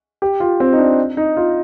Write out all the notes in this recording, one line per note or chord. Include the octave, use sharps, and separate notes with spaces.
G4
F4
C4
D#4
D4
D#4
F4